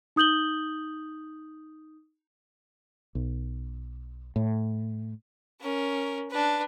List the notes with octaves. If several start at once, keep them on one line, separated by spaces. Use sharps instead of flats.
D#4 D#6 G6 F#7 G7
B1
A2
C#4 A#4
D4 B4